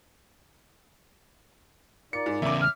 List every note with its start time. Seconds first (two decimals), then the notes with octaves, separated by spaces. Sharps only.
2.13 A#2 D#4 D5 C#7
2.26 G#2
2.42 E2 C#3 E5 D6
2.62 F6